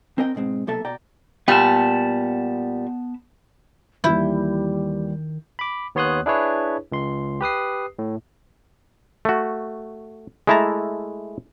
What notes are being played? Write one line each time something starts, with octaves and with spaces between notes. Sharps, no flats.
C4 A#4 D#5 G5
G#2 B2 G#3 C4
B1 C3 A#3 A4 E5 A5
B2 D5 G5 A#5
A#2 G3 B3 A5
D#2 D#3 E3 G3 E4 G6
B5 D6
D#2 B3 C#5 C6 D#6 F#6
D4 E4 G#4 B4 C#5
C#2 C6
G4 B4 D#6 C7
A2
A3 F#4
G#3 A3 E4 E5 A5 A#5